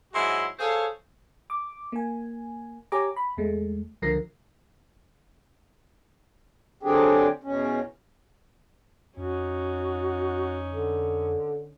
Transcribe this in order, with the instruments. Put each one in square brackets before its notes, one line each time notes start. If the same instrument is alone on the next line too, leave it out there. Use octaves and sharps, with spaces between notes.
[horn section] G#2 F#3 E4 F#4 C6
G#4 A4 C5 C#5 F5
[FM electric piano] D6
A#3 G#5
G4 C#5 G#5 A#5 D6
B5
E2 G#3 A3
C#2 D3 F3 A#4 A#6 C7
[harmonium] D3 F#3 C4 D4 G4 G#4
E2 B2 C#4
[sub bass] F2 [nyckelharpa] C#4 D#4 [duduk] F#4
[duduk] D3